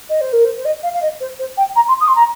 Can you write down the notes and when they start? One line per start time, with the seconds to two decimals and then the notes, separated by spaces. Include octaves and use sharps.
0.09 D#5
0.21 C5
0.33 A#4
0.45 C5
0.58 C5
0.65 D#5
0.83 F5
0.94 F5
1.02 D#5
1.21 C5
1.39 C5
1.57 G5
1.76 A#5
1.88 C6
2.00 D#6
2.08 C6
2.16 A#5